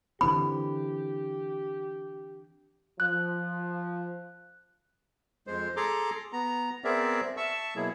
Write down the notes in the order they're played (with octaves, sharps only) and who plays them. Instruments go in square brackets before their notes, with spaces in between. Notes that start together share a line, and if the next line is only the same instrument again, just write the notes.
[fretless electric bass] D3 E3 C4 [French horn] G4 [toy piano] B5
[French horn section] F3 [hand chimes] F#6
[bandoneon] F2 G#3 C5
G#4 A4 A#5 C6 D6
B3 A#5
B3 C4 G#4 A#4 D5 E5
E5 A5 C#6 E6
B2 F#3 A#3 E4 G#4